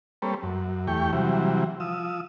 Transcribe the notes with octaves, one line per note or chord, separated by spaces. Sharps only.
G3 A#3 C4 A4 B4 C#5
F#2
E2 A3 G4 G5 C#6
C3 E3 F#3 G3
F3 D#6 E6